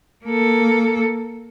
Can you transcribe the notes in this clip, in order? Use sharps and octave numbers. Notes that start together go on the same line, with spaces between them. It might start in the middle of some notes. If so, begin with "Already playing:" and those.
A#3 A4